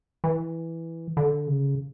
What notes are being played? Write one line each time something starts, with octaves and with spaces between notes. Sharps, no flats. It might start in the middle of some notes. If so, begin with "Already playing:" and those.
E3
D3
C#3